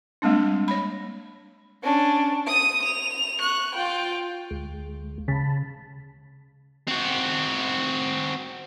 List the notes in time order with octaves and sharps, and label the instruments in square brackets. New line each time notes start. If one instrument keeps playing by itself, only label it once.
[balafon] G3 G#3 A#3 C4 D4
C#5 B5
[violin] C#4 D4
D#6 D#7
F7
C#6 F#6
F4 G5
[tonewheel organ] D2 G#3
[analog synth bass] C#3 [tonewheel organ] A5 B5
[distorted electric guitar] C4 F#4